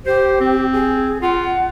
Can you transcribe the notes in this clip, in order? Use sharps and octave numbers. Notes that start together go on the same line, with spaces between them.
G4 C5
C4
G#4
F4 F#5